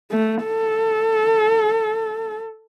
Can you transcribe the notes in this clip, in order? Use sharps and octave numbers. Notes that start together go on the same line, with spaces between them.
A3
A4